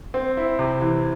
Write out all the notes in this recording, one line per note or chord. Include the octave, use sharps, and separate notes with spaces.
C4
E4
C3
E3